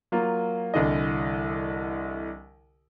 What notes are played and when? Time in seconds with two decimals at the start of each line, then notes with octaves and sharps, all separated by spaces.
0.12 F#3 A#3 F4
0.74 C2 D3 E3 D#5